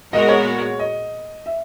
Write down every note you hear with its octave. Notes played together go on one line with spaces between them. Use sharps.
A#2 G#3 B3 F#4 A#4 D#5
C#5
D#5
E5